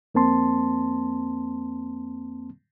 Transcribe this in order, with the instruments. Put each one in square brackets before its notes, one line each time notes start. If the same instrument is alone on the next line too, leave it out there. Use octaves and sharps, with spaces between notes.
[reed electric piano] F2 A#3 C4 A5 C6